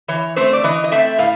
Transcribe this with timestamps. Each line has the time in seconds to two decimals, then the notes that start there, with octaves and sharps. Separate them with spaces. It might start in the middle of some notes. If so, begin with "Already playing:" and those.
0.08 E3 C#5
0.36 A3 C4 C5
0.53 D5
0.64 E3 D#5
0.84 D#5
0.92 A3 C4 E5
1.18 A2 F5